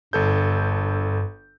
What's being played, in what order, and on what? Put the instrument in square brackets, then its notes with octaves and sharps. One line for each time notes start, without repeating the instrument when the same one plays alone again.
[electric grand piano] G1 A4 G6 [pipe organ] G2